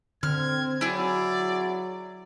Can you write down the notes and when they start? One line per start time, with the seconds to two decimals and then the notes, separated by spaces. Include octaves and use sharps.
0.23 D3 C4 F6 G#6
0.81 F#3 E4 G#4 D5